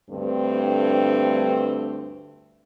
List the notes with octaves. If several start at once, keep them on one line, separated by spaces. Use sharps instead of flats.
D2 G2 A3 C4